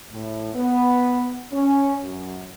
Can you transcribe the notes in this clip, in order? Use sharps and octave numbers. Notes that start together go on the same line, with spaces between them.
A2
B3
C#4
F#2